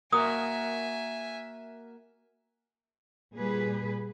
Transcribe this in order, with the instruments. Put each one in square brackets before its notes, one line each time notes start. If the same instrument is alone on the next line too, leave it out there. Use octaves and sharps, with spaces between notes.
[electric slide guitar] A#3 F#4 A#4 [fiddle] E5 G#5 [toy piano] D#6
[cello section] A#2 G3 G#4 B4